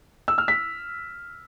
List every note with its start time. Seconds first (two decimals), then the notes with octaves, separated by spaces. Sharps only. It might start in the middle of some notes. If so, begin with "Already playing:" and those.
0.28 E6
0.38 F6
0.48 B6